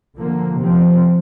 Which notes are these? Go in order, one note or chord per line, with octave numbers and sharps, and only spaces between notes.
D3 F3 A#3
C3 F3 C4